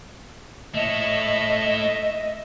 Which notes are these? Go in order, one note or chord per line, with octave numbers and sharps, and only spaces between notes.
A3 C#5 D#5 E5